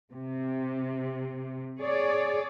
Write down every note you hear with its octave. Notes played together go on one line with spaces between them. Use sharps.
C3
G#4 C#5 D5